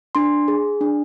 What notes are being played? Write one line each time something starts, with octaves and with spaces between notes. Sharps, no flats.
D4 C6
G#4
D4